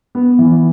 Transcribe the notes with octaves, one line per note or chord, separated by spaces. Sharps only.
B3
E3